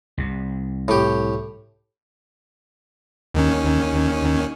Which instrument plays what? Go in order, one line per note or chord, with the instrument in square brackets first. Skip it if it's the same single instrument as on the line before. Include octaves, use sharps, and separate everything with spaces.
[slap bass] C2 C3
[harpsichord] A2 G4
[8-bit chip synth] D#2 D#3 C#4